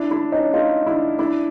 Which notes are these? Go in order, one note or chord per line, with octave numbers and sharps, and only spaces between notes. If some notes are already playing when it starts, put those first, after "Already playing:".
Already playing: D4 E4
D4 E4
C#4 D#4
D#4 F4
D4 E4
D4 E4